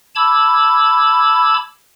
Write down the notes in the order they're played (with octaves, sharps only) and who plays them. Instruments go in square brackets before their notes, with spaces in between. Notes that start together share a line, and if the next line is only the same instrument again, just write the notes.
[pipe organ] A5 B5 D6 E6 G#6